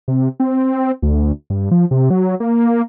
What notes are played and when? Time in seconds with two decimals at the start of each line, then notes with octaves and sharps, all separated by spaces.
0.08 C3
0.40 C4
1.03 D2
1.50 G2
1.71 F3
1.91 C3
2.10 F#3
2.40 A#3